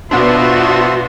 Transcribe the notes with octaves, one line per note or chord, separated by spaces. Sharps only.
B2 B3 D4 F4 F#4 C5 E5 C6